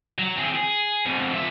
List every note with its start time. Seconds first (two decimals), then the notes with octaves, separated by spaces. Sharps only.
0.18 F#3
0.36 C4 G#4
0.54 G#4
1.05 F2 B2
1.34 F3 E5